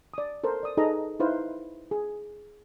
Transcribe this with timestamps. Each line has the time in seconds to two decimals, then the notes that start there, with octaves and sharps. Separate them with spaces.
0.14 D5 D#6
0.44 A4 A#4 C5
0.63 D5 D#6
0.77 D#4 G#4 A4 B4 D#5 A#5
1.20 D#4 E4 B4 C5 F5
1.91 G#4